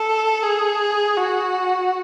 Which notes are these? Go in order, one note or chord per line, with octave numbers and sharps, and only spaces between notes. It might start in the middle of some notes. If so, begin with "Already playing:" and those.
Already playing: A4
G#4
F#4